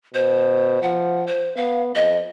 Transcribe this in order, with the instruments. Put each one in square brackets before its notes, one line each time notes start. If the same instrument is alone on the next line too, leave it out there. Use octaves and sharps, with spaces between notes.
[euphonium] B2 [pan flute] C5
[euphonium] F3 [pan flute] F#5
[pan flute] C5
[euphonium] B3 [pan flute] F5
[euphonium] F2 [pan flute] D#5